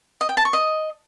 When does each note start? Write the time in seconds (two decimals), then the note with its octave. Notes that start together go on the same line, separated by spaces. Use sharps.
0.21 D#5
0.29 G5
0.37 A5
0.45 C#6
0.53 D#5